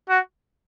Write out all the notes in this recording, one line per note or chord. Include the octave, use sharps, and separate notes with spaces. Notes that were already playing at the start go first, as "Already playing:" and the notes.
F#4